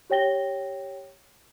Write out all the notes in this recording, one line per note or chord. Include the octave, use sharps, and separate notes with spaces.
G4 C#5 G5 A#6 G7